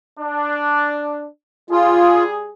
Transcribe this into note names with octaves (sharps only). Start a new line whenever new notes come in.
D4
G3 F4 G#4